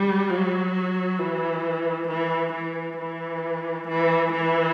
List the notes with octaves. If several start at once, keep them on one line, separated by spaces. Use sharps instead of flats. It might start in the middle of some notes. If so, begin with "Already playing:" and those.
Already playing: G3
F#3
E3
E3
E3
E3
E3
E3